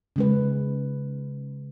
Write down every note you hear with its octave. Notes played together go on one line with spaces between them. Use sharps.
C#3 G#3 B4